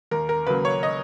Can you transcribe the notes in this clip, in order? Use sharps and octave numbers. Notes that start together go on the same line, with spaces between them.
D#2 A#4
A#4
C#3 F#3 A#3 B4
C#5
D#5